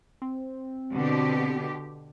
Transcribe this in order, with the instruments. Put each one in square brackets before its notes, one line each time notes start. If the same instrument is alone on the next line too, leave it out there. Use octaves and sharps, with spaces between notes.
[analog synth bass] C4
[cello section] B2 D3 G4